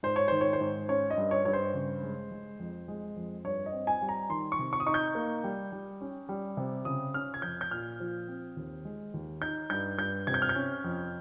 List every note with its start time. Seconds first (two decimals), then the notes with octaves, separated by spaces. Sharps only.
0.03 G#2 C5
0.16 C#5
0.28 D#3 C5
0.41 C#5
0.53 C5
0.61 G#2
0.89 C#4 C#5
1.10 D#5
1.17 G2
1.31 C#5
1.45 G2 C#5
1.53 C5
1.74 C#3
2.03 G#3
2.31 G#3
2.59 F2
2.88 G#3
3.16 F2
3.44 G2 C#5
3.66 D#5
3.72 C4
3.87 G#5
4.02 G3
4.09 A#5
4.30 D#3 C6
4.52 C#6
4.59 C3
4.73 C#6
4.80 D#6
4.86 D#4 C#6
4.94 G6
5.15 A#3
5.44 G3
5.72 G3
6.01 C#4
6.29 G3
6.57 C3
6.85 C#3 D#6
7.14 C#4 F6
7.34 G#6
7.42 F2 G6
7.61 G6
7.71 A#2 F6
8.00 F3
8.28 C4
8.57 D#2
8.85 G#3
9.14 D#2
9.42 D#4 G6
9.70 G2 G6
9.98 G2 G6
10.27 C3 G#6
10.34 G6
10.42 F6
10.49 G6
10.55 C#4
10.84 F2